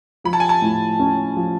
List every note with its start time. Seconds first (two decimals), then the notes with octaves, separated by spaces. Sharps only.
0.24 F3 B5
0.33 A5
0.40 G#5
0.49 A5
0.62 A2
0.99 C#4
1.37 F3